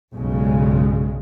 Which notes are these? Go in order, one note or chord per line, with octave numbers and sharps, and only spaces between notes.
B1 G2 C#3 G#3